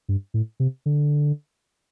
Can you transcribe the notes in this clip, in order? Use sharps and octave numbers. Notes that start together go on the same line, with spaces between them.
G2
A2
C3
D3